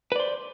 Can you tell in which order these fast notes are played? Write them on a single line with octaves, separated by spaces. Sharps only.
B4 D5 C5